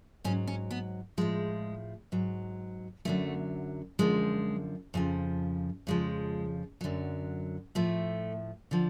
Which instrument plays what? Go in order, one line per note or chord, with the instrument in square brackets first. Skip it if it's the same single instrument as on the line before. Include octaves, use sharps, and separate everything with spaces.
[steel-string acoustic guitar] G#2 F#3 C#4
C#4
B3
A2 F3 G#3
G#2 F#3
F#2 D3 F#3 A3
F#2 D3 F3 G#3
F2 C#3 F3
F2 C#3 F3 G#3
F#2 D3 F#3
A2 F3 A3
D3 F3